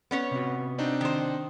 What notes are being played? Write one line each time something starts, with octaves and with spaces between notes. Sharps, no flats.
B3 C#4 C#5
C3 F#4
C4 D4 D#4
D#3 C5